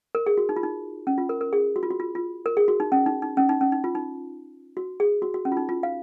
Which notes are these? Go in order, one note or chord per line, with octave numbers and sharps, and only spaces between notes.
A#4
G#4
F#4
D#4
F4
D#4
C#4
F4
A#4
A#4
G#4
F#4
F4
F#4
F4
F4
A#4
G#4
F#4
D#4
C#4
D#4
D#4
C#4
D#4
C#4
D#4
F4
D#4
F#4
G#4
F#4
F#4
C#4
F4
D#4
F4
F5